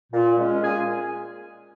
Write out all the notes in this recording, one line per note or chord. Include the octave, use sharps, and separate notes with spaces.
A#2
G#3 C#4
A#2 G#4 G#5